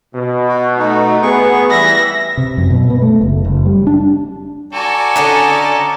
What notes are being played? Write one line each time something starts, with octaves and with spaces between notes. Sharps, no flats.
B2
F#4
A3 D#4 F#4
B3 G#4 C#6
E3 G3 E5 B5 A#6
C3
F#2
B2
B3
A3
F#1
F#1
G3
D4
F#4 A4 D5 G#5 A#5
D3 C#4 D#4